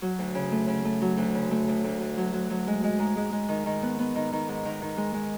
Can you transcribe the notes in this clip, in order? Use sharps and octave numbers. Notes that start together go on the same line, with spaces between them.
F#3
D2
C#3
A3
C#3
A3
F#3
D2
C#3
A3
D2
D2
D2
F#3
F#3
F#3
G#3
G#3
G#2
G#3
G#3
D#3
D#3
B3
B3
D#3
D#3
G#2
D#3
D#3
G#3
G#3